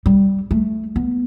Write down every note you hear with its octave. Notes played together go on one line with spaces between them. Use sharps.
G3
A3
B3